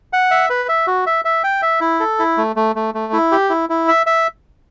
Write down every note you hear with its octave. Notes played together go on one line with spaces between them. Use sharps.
F#5
E5
B4
E5
F#4
E5
E5
G5
E5
E4
A4
E4
A3
A3
A3
A3
E4
G4
E4
E4
E5
E5